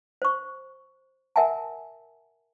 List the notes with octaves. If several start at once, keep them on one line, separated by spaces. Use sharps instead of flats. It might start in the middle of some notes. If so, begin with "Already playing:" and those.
C5 C#6
A#4 E5 F#5 G#5 A5